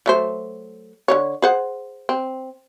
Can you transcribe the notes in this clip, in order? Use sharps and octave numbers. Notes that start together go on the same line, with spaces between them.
F#3 A3 C5
D3 G3 C#5
G#4 C5 F#5
C4